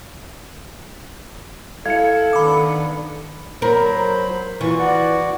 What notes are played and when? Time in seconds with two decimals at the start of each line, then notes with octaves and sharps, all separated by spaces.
1.86 E4 A4 F5 G#6 C#7
2.33 D#3 B3 D4 B5 D6
3.62 F#3 A#4 C5 B5
4.61 E3 F4 C#6
4.79 F#4 D5 F#5